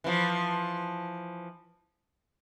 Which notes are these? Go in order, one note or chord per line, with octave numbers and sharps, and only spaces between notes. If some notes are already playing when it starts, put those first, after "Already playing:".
E3 F3